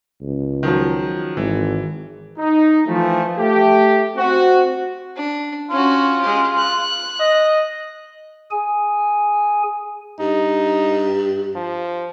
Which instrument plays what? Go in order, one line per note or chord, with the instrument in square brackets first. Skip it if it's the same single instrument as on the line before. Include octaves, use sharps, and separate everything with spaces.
[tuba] C#2
[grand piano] D#3 F3 F#3
[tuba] G#1 [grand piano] E3
[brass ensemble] D#4
E3 F3 A3
A3 G4
C4 F#4
[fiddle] D4
[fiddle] C#4 F#4 [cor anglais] F4
[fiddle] G#3 G4
F#6
[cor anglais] D#5
[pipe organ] G#4 G#5
[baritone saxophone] G2 [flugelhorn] D#4
[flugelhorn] F3